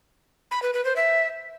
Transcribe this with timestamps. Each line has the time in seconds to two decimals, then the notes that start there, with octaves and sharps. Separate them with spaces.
0.51 B5
0.62 B4
0.74 B4
0.85 C5
0.96 E5